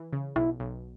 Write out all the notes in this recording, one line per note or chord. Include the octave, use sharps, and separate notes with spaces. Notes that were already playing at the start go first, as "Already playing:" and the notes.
Already playing: E3
C#3
B1 E4
B1